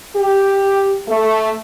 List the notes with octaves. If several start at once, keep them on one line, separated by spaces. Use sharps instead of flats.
G4
A3